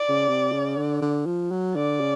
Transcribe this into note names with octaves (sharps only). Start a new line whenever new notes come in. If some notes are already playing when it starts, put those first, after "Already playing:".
Already playing: D5
C#3
C3
C#3
D3
D3
F3
F#3
D3 D5
C#3